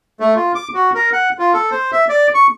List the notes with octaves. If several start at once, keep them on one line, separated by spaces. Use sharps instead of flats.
A3
F4
D6
F#4
A#4
F#5
F4
A4
C5
E5
D5
C#6